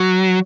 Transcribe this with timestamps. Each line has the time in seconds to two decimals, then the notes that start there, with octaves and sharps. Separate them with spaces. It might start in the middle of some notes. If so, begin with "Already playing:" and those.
Already playing: F#3